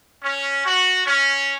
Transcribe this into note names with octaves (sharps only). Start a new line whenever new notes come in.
C#4
F#4
C#4